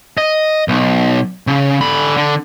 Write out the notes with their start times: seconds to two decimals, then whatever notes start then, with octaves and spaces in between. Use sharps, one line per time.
0.18 D#5
0.68 B1
1.47 C#3
1.81 D3 B5
2.17 D3